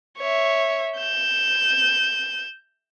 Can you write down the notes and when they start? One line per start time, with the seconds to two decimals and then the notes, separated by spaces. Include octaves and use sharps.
0.18 C#5 E5
0.98 G6 E7